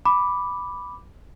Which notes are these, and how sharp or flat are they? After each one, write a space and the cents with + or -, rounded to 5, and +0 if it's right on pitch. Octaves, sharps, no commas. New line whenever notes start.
B5 +0 D6 +0